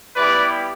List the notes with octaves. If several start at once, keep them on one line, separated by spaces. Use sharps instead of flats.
G3 B3 E4 G4 B4 D5